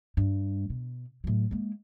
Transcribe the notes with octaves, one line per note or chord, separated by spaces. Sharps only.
G2
B2
A2 F#3
G#3 A#3